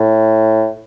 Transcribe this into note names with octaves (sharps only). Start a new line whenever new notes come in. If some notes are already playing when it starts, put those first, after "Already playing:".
Already playing: A2